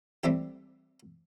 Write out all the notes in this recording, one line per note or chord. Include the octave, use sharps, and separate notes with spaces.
G3 A3 C4 E4 G4